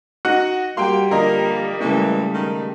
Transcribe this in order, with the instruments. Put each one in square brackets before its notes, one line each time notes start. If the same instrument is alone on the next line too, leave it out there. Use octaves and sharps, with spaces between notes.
[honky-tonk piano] D#4 F#4 F#5
[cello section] G3 [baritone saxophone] A#3 [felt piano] F#4 G4 [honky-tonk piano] G5 C6
[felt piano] D3 F3 A#6 [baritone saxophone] A#3 [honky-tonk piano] A#4 D#5
[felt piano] C#3 G#3 A3 [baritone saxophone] E3
[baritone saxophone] D#3